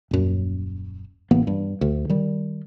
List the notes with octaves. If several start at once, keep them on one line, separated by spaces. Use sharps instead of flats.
D#1 F#2
A1 E3 A#3 B3
G2
D2
D#3 G3